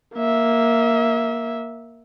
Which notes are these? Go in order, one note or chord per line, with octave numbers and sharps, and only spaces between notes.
A#3 E5